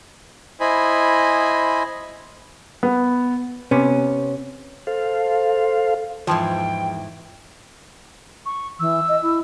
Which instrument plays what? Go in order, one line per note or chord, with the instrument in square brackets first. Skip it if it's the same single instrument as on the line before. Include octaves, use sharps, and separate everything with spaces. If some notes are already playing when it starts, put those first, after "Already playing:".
[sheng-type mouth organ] E4 C5 D#5 G#5 B5
[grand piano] B3
[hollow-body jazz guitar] C3 B3 C#4
[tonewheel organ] A4 C5 F5
[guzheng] E2 G#2 E4 [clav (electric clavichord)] F3 [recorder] G5
[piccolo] C#6
[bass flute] E3 [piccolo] E6
[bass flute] D#5
E4